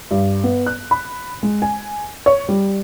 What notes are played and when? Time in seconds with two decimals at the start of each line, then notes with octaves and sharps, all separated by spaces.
0.11 G2
0.44 B3
0.66 F#6
0.91 B5
1.43 G#3
1.62 G#5
2.26 C#5
2.49 G3